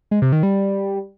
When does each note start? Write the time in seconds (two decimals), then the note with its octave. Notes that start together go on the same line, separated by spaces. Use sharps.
0.11 G#3
0.22 C3
0.33 D#3
0.43 G3